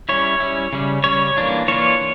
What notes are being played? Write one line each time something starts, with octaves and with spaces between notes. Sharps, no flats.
G3 C#4 E4 C#5
G3 C#4 E4
C#3 G3 C#4
C#3 G3 C#4 C#5
E3 A#3 D4 F4
E3 A#3 D4 F4 C#5